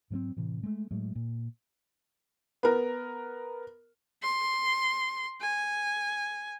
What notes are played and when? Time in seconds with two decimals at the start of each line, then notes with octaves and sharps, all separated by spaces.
0.10 G#2 F#3 A#3 C4
0.36 A2 C3 E3
0.63 G#3 A3
0.91 A2 F#3 G#3 A3
1.15 A#2
2.63 B3 A#4
4.23 C6
5.41 G#5